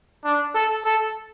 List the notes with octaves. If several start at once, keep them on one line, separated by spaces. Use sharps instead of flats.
D4
A4
A4